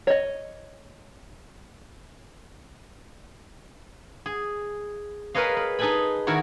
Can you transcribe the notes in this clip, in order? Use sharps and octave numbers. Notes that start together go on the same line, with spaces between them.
C#5 D#5
G#4
G#4 A#4 B4 C#5 D#5 F5
B4
D#4 G#4 A4 B4 G#5 B5
D#3 E4 F#4 A#4 C#5